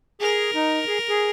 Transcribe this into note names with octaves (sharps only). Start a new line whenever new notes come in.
G#4 A#4
D#4
G#4
G#4